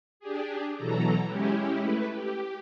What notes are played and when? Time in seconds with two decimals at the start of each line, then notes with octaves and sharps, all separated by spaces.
0.20 D4 G4 G#4
0.78 B2 E3 F#3 A4 A#5
1.27 G#3 C#4 E4 G4
1.81 A3 E4 B4
2.13 G4